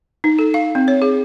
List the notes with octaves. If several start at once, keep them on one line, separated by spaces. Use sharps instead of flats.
D#4
A4
F5
C4
C#5
G#4